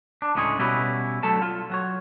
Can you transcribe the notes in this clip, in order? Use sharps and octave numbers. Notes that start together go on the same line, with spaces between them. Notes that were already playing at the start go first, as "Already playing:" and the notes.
D4
D2 A2 C#3 G#3 G#4 C#5
B2 G3 C#4 E4 F#4 B4
D3 F#3 A3 A4 A5
F4
F#3 F#4 C#5